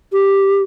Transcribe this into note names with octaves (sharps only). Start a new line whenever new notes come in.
G4